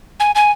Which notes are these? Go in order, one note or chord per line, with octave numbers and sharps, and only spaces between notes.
G#5
G#5